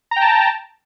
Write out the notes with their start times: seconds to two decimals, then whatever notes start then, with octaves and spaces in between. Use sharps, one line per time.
0.11 A#5
0.16 G5
0.21 A5